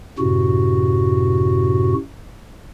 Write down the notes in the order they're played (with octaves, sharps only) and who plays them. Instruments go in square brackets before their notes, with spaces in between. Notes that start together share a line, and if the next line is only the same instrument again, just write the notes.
[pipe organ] F#2 A2 C3 F#4